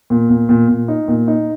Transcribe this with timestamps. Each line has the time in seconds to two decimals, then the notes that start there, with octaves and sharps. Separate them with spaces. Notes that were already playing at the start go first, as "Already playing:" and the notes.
0.10 A#2
0.30 A#2
0.49 A#2
0.68 A#2
0.88 D#4
1.08 A#2
1.28 D#4